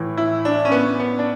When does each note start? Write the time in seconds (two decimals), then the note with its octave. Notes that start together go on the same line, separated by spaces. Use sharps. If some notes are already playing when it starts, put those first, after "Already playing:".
Already playing: A2 E3
0.17 E4
0.45 D4
0.65 C#4
0.72 B3
1.00 B3
1.19 D4